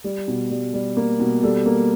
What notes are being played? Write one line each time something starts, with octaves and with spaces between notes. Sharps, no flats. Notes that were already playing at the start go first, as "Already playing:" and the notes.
G3
B2
G3
G3
A#3
B2
G3 A4
A#3